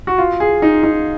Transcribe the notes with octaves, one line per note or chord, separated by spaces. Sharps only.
F#4
F4
G#4
D#4
D#4